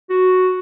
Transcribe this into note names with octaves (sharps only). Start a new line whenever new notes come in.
F#4